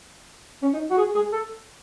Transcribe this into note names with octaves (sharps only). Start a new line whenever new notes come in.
C#4
D#4
F#4
G#4
G#4
A4